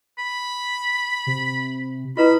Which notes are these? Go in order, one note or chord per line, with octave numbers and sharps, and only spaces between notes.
B5
C3
E4 F4 B4 D#5 A#5 B5